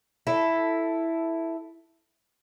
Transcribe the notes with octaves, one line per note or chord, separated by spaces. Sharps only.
E4 A4